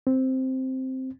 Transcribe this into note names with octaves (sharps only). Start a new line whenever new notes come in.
C4